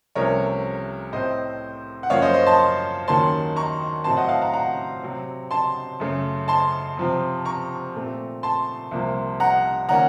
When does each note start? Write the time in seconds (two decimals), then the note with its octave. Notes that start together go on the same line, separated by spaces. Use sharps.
0.15 C2 C3 F3 A3 C#4 A#4 C#5
1.12 A2 A3 C4 C5 D#5
2.03 F#5
2.10 F#2 F3 A#3 C#4 C#5 F5
2.22 C5 D#5
2.34 C5 D#5
2.47 A5 C6
3.08 D#2 D#3 F#3 A#3 C#4 A5 C6
3.56 A#5 C#6
4.04 A2 F#3 C4 A5 C6
4.17 D#5 F#5
4.29 F5 A5
4.42 F#5 A#5
4.54 F#5 A#5
5.02 C3 F#3 C4
5.51 A5 C6
6.00 F#2 C#3 A3
6.48 A5 C6
6.97 C3 F3 C4
7.45 A#5 C#6
7.95 A#2 A3 C4
8.43 A5 C6
8.91 C2 C3 F3 A#3
9.40 F#5 A#5
9.89 D#3 A#3 C#4 F#5 A#5